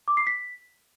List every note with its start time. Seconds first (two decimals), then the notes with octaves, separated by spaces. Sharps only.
0.08 D6
0.17 C7
0.27 B6